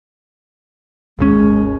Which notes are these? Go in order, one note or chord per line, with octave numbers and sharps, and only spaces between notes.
G#1 D#2 G#3 C#4